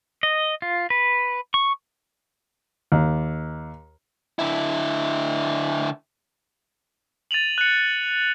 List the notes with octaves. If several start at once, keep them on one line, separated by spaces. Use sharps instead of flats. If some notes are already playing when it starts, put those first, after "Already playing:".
D#5
F4
B4
C#6
D#2
D3 E4
A6 D#7 F7 F#7
F#6 C#7